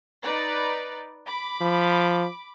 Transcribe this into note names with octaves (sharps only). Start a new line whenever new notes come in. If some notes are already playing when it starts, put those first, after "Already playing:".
D#4 B4 D5
B5 D6
F3